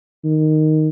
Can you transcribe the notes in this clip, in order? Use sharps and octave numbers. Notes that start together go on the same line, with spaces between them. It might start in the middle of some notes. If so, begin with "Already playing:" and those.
D#3